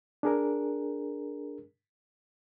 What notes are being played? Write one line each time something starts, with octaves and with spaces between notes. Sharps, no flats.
D4 G#4 A#4